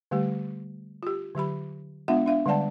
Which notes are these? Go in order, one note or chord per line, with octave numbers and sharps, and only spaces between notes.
D3 G3 A3 G4
F4 G4
D3 F#3 G4 B5
G#3 B3 D4 F4 E5 F#5
D4 E5 F5
D3 G3 G#3 D5 F#5 A5